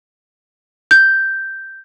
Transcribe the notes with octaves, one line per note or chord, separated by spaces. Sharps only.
G6